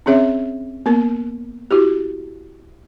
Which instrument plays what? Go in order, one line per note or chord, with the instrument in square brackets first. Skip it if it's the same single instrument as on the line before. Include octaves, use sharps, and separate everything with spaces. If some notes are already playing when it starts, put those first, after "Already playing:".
[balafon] C4 C#4 G#4 C#5 E5
A#3 B3 A#4
E4 F#4 G4